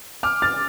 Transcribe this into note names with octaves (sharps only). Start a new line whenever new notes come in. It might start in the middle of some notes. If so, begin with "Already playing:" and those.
D6 F6
F6 A6